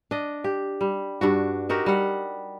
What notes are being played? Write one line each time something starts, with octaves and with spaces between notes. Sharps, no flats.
D4 D#5
G4
G3
G2 D4 F#4
D#4 F#4 G4 A#4
G3 F#5